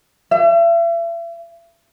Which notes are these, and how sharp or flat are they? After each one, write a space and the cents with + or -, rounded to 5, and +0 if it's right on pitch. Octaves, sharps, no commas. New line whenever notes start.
E5 +40